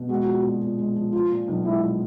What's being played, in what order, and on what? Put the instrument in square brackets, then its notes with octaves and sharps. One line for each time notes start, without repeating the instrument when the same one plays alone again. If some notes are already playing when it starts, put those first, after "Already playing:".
Already playing: [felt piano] B2
[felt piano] G#3 [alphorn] F#4
[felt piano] F3
A#2
A#2
G#3
F3
[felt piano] F3 [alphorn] F4
[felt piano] A#2
B1
[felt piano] G#3 [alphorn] E4
[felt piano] F3